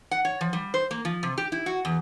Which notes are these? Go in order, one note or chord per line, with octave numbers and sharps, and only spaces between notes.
F#5
C#5
F3
G3
C5
A#3
F3
C3
G4
E4
F#4
E2